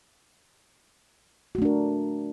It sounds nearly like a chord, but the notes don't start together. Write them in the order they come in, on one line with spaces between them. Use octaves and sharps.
F#4 A3 D4 A#4